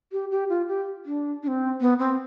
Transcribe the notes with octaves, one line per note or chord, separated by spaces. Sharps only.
G4
G4
F4
G4
D4
D4
C4
B3
C4